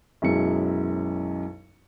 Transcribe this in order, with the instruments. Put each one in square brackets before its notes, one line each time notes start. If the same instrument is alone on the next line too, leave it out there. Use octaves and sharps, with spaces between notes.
[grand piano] B1 F#2 F#3 G#3 E4 C#7